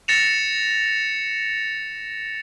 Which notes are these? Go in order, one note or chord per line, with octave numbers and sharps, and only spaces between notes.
A6 A#6 C#7 E7 F7